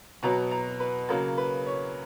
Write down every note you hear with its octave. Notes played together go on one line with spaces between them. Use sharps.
B2 F#3 B3 A#5
A#5
B4
C#3 F#3 A#3
B4
C#5